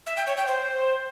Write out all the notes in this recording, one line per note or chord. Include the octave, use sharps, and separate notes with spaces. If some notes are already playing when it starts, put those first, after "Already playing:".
E5
G5
C#5
G5
C5